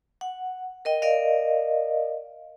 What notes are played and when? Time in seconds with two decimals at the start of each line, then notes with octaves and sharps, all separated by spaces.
0.21 F#5
0.85 A#4 D#5 G5
1.02 A#4 D5 D#5 F5